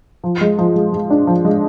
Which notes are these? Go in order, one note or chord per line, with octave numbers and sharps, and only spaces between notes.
F3
G#3
F3
G#3
G#3
D4
F3
G#3